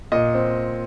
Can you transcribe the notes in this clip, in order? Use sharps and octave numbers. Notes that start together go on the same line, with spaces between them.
A#2 D#5
C4